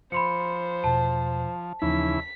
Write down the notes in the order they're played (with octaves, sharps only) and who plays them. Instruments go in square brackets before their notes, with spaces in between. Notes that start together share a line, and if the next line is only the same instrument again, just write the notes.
[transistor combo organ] F3 [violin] C5 [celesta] B5 C6 C#7
[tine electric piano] E2 B2 [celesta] A5
[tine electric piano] D#2 F3 D#4 [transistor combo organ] C#3 E3 E4 [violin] B6